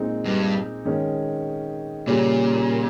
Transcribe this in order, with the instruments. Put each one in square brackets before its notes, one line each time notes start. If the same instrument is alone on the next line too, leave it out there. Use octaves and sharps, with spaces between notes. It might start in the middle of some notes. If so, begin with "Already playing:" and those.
Already playing: [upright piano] A#2 G#3 C4 D#4
[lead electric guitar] G2
[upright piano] D#3 G#3 C#4
[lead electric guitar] A#2 [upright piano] C#3 G3 C#4